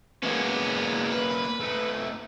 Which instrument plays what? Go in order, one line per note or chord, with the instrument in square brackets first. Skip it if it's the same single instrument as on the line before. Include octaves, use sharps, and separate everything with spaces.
[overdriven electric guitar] G#3 B3 [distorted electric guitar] A#3 C#4
[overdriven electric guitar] B4
[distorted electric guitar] A3 D#4